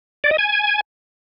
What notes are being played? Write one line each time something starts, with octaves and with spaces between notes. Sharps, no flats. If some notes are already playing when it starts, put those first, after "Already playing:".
D5
D#5
G#5